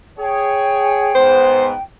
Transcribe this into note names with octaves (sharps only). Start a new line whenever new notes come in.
G#4 C#5 G5
G#2 B3 C5